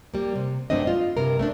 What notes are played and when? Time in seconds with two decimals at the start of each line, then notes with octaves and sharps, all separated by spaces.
0.14 G3 A#3
0.36 C3
0.70 G2 F#3 A3 C4 D4 D#5
0.87 F4
1.17 G2 C3 A#4
1.39 A3 C4 D4